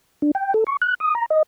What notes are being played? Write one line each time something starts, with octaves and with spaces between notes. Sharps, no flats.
D4
G5
A4
C#6
F#6
D#6
A#5
D#5